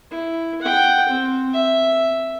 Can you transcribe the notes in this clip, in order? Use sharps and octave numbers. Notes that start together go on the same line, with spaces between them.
E4
F#5 G5
C4
E5